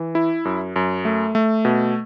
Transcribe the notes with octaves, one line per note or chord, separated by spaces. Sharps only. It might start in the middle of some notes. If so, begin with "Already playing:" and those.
Already playing: E3
E4
F#2
F#2
A3
A3
B2